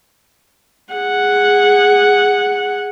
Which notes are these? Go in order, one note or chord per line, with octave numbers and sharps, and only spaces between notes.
G#4 F#5